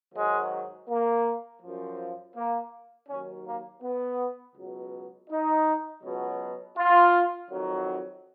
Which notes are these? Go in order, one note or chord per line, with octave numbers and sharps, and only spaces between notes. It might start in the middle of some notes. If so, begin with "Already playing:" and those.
G#2 D#3 F#3 G#3
A#3
F#2 F3
A#3
D#2 D#3 F#3 C#4
A#3
B3
C#2 B2 F#3
D#4
C#2 B2 F#3
F4
F2 D#3 F#3